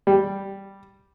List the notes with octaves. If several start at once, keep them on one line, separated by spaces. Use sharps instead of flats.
G3